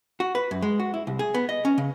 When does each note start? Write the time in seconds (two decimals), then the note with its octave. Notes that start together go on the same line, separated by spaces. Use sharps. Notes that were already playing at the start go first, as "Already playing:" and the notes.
0.20 F#4
0.35 B4
0.51 F#2
0.62 G#3
0.80 F#4
0.94 E4
1.07 C2
1.19 G#4
1.34 B3
1.49 D#5
1.65 C#4
1.78 C#3